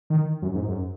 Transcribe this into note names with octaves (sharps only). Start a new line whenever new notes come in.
D#3
F#2
G#2
F#2